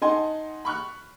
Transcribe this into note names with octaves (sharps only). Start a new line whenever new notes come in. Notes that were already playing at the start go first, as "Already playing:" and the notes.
D#4 D#5 F#5 G#5 A5 C6
B5 C#6 F6 F#6